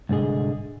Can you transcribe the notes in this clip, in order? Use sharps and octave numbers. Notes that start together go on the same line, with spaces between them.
C2 G#2 D3 G#4 D#5